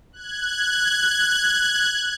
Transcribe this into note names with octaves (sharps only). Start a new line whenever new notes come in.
F#6 G#6